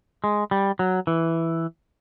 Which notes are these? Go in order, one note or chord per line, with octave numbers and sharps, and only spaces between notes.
G#3
G3
F#3
E3